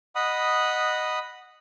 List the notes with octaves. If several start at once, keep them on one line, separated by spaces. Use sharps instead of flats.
D#5 F#5 B5 D#6